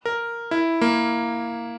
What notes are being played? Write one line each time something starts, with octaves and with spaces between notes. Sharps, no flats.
A#4
E4
A#3